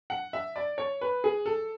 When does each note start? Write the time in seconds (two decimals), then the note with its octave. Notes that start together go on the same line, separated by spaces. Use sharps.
0.10 F#5
0.33 E5
0.56 D5
0.78 C#5
1.01 B4
1.24 G#4
1.46 A4